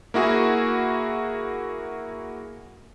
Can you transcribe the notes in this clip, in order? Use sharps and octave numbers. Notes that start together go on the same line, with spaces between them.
A#3 E4 F#4 G#4